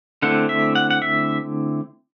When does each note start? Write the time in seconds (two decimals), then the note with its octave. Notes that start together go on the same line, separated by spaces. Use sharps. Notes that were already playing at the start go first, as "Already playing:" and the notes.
0.22 D3 A3 C4 E4 F#5
0.49 E5
0.75 F#5
0.90 F#5
1.02 E5